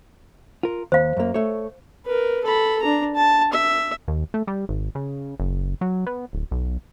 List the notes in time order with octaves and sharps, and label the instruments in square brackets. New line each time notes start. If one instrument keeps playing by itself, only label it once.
[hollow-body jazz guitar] F4 A#4
[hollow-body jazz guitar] D#2 [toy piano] C5 F5
[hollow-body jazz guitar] F#2 A#3
A3 C#5
[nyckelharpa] A#4 B4
A4 B5
D4 A#5
A5
E5
[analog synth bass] D#2
A3
G3
G#1
C#3
F#1
F#3
B3
D1
B1